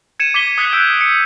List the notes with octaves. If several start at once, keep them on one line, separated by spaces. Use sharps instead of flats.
G#6 C#7 D#7 E7
D6 G#6 B6 E7 G7
D#6 F#6 G#6 B6 C#7 G7
E6 F#6 G6 D7
C#7